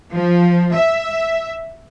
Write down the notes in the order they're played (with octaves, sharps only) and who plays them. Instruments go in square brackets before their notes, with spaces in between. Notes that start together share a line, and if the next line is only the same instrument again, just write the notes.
[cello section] F3
E5